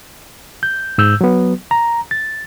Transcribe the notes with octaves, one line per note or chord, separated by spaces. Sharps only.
G6
G#2 E6 G6
F#3 B3
A#5
A6